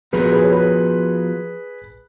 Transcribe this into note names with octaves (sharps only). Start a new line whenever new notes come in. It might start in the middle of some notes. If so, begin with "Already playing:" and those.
F3 B3 F#4 G#4 A#4 B4
G#4 B4
C#5
G#4 B4